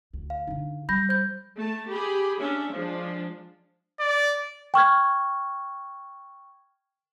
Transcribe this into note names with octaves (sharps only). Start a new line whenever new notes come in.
D2
F5
D3 D#4
G3 B5 G6 A#6
C5 G6
A3 A5
G4 G#4 B5
C#4 D4 E5
F3 G#3 D4
D5
G5 C#6 F6 G#6